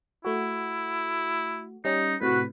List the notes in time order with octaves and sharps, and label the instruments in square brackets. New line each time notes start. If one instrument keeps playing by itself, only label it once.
[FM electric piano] A3 F#4 [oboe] E4
[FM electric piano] G3 C#4 D#5 [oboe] D#4
[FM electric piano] A2 C3 [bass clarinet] F#4 [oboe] B4